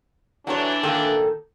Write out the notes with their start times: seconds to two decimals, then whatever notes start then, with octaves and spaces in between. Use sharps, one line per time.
0.47 E3 F#3 D4 F#4 C#5
0.83 A#2 D#3 A4